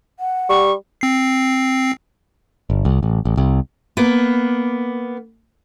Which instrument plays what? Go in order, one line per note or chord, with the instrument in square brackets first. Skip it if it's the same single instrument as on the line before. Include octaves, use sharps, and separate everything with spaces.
[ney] F#5
[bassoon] G3 [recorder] C#6
[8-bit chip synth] C4 C7
[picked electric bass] G1
C2
A1
A1
C2
[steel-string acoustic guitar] A#3 B3